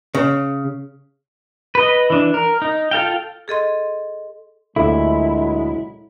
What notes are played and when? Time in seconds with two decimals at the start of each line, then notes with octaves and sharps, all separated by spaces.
0.15 C#3
1.75 B4 D#5
2.10 E3 D4
2.34 A#4
2.62 D#4
2.91 F4 A4 F5 G5
3.48 G#4 A4 D#5 C6
4.76 D2 A#2 F#3 G#3 E4 A4